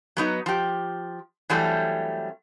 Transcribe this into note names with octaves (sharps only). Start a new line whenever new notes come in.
F#3 B3 D#4
F3 G4
E3 F#3 G3 A3 C4